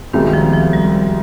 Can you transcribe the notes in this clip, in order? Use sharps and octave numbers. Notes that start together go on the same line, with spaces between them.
C2 B2 D#3 G#3 C4
D#3
F3
F3
G3